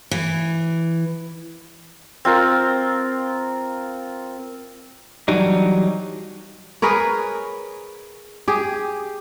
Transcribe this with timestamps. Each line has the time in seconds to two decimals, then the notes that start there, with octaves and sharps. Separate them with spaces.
0.11 E3
2.25 C4 F4 A#4
5.28 E3 F#3 G3 D4 D#4
6.82 G#4 A#4 B4 C#5
8.48 G4 G#4